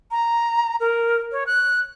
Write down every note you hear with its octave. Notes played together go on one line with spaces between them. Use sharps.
A#5
A#4
C#5
F#6